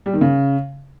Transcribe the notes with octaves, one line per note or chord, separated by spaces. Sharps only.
G3
D#3
C#3